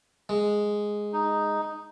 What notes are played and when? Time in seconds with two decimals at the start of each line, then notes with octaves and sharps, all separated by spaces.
0.29 G#3
1.13 D#4